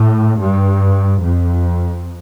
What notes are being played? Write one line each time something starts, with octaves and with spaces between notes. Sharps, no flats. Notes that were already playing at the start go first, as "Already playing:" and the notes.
Already playing: A2
G2
F2